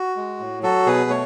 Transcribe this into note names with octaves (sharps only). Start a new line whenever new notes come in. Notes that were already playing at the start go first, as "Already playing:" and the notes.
Already playing: F#4
G#3
A2
F#3 F#4 A4
B2 G#4 B4
A3 C#5